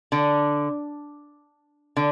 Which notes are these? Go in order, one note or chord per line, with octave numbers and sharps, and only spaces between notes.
D3
D3